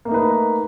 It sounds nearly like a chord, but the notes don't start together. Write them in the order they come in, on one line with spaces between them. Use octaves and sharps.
A#3 A3 D#4 B4